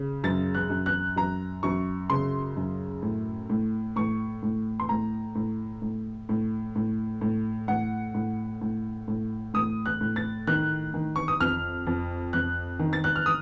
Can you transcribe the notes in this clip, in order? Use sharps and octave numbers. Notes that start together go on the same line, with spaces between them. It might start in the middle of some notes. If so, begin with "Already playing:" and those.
Already playing: C#3
F#2 A6
F#6
F#2
F#6
F#2 A#5
F#2 C#6
C#3 C6
F#2
A2
A2
A2 C#6
A2
C6
A2 A#5
A2
A2
A2
A2
A2
A2 F#5
A2
A2
A2
A2 D#6
F#6
A2
A6
D#3 F#6
D#3
C#6
D#6
F2 F6
F2
F2 F#6
D#3
A6
F#6
F6
D#6